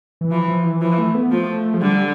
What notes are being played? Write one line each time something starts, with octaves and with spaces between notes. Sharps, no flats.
E3
E3 F3
F3
E3
E3 F3
A3
B3
F3 A3
F3
D3 G3